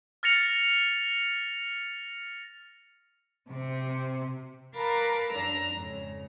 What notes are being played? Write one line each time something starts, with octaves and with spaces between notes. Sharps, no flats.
F6 A6 A#6 C#7 F7
C3
A#4 B4 F5 A5 B5 D6
F#2 D4 A#5 E6
F2 G#2 C#3